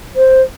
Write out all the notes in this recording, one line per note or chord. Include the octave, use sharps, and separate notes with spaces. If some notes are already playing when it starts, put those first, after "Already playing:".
C5